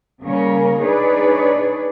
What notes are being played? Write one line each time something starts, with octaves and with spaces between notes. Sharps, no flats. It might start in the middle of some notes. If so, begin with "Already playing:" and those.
C#3 G3 A#3 C#4 A#4 C#5
D4 D#4 G#4 B4 C#5 D5